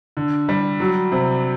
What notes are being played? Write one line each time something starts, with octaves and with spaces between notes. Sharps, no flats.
D3
G3
F#3
C3